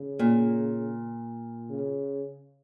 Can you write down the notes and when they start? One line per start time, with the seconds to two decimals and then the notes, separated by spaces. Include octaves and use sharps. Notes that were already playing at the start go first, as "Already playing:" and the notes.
Already playing: C#3
0.19 A#2
1.70 C#3